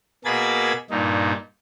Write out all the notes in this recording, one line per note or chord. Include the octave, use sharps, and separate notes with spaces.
B2 A#3 G#4 B5 G#6 A6
G2 A#2 D#4